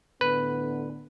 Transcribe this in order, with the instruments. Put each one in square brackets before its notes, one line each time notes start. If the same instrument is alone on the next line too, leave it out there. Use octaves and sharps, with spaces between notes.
[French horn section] A2 D3 B3 [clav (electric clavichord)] B4